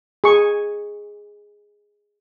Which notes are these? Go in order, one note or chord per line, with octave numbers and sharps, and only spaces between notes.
G#4 C#6